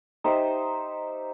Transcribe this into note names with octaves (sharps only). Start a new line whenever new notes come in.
D#4 G4 C5 E5